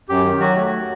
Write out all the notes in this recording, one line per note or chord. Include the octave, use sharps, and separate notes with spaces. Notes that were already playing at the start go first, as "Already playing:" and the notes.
F#2 G4
D#3
F#3 F#4
A3